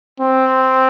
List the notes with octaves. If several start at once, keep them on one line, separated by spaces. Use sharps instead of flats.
C4